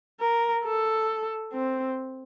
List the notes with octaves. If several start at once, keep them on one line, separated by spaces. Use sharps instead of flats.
A#4
A4
C4